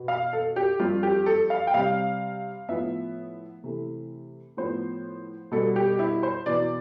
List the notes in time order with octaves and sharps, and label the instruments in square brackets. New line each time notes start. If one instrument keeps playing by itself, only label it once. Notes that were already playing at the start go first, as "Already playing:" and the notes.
Already playing: [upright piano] B2 B3
F5
A4
G4
G2 F3 C4 F4
G4
A4
F5
G5
C3 G3 C4 F5
A2 F3 B3 E5
C3 E3 A3
A2 F3 B3 C5
B2 G3 B3 A4
G4
E4
C5
E2 B2 B3 D5